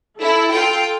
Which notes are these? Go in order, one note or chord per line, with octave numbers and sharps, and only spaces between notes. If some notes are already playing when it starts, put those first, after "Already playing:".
E4 A4
F4 G5